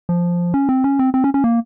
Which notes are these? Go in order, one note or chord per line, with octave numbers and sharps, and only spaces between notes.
F3
C#4
C4
C#4
C4
C4
C#4
C#4
A#3